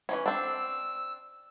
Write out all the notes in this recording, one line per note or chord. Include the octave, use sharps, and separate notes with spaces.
E3 F3 C#4
C4 D4 E6